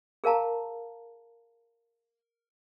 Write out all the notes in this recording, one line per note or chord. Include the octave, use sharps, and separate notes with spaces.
G#4 A#4 F5 A5 A#5